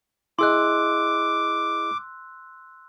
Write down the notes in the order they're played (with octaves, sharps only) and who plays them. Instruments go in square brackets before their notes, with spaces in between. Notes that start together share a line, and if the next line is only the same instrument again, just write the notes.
[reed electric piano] E4 G#4 D#5 [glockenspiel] C6 E6 F#6 [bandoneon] D6